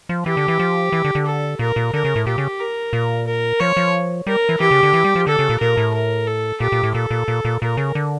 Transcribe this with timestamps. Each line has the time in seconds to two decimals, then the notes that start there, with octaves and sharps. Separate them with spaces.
0.09 F3
0.26 E3 G4
0.37 D3
0.48 E3
0.59 F3
0.92 E3
1.05 D3
1.15 D3
1.26 A4
1.59 A#2 A#4
1.76 A#2
1.93 D3 A#4
2.05 C#3
2.16 A2
2.27 A#2 G4
2.38 C#3
2.60 A#4
2.93 A#2
3.27 A#4
3.60 F3 C#5
3.77 F3
4.27 G3 A#4
4.49 E3
4.60 E3 G4
4.71 C#3
4.83 D3
4.94 E3
5.04 G3
5.16 F3
5.27 D3 A4
5.39 C#3
5.50 A#2
5.60 A#2 A#4
5.77 A2
5.94 A#4
6.27 A4
6.60 A#2 G4
6.72 A#2
6.83 A2
6.95 A#2 A4
7.11 A#2
7.28 A#2
7.45 A#2
7.61 A#2 A#4
7.77 C#3
7.95 D3